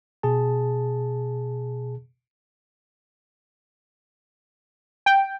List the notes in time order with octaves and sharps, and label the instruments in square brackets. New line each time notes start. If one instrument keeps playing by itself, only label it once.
[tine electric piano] B2 G#4 A5
[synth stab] G5